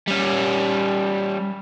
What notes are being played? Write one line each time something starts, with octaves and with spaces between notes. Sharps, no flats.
G3 C#4